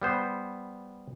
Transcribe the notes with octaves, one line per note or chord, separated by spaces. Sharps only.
G3 B3 C5